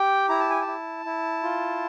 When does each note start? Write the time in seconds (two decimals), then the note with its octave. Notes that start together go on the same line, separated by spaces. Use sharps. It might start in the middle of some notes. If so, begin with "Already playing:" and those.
Already playing: G4 G5
0.29 E4 A#5
0.39 A5
0.50 G#5
0.61 A5
0.67 E4
1.05 E4
1.43 F4